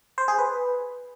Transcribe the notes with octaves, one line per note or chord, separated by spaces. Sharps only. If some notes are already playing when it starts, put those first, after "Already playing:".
C5
G#4
B4